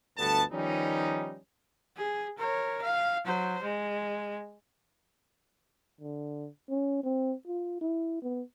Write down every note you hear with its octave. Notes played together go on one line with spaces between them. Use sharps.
G1 D2 G2 B3 A4 A5
D#3 F3 G3 B3 C#4 D#4
G#4
A#4 C#5
F5
F#3 C5
G#3
D3
C#4
C4
F4
E4
B3